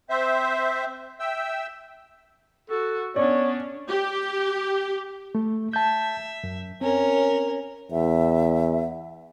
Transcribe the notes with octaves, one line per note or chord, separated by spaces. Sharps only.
C4 C5 E5
E5 G5 E6
F#4 A4
B3 C#4 D4 C#5 D5
G4
A3
E5 A5 G6
F#2
C4 C#4 A#4
E2 E5